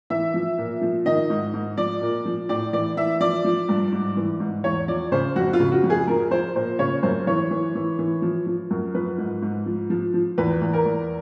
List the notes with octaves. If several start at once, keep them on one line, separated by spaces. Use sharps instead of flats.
E3 E5
F3
A#2
F3
D#3 D#5
G#2
G#2
F3 D5
A#2
F3
A2 D5
E3 D5
E3 E5
F3 D5
F3
G2
G#2
E3
G#2
E2 C#5
F3 D5
C#3 C5
F2 F#4
F4
C#3
F#4
F2
G#4
F3 A#4
F3 C5
A#2 C5
C#3 C#5
F#2 C5
E3 C#5
E3
E3
E3
F3
F3
F#2
F3 B4
G#2
G#2
F3
F3
F3
E2 B4
E2
A#4
E2